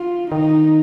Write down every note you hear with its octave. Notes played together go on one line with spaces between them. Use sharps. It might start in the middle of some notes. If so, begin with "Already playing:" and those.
Already playing: F4
D#3 D#4